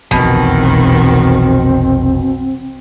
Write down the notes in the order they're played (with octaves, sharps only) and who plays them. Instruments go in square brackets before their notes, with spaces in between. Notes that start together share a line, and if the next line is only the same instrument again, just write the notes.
[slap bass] F1 B1 F3 [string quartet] E2 D#3 [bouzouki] B2 [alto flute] C4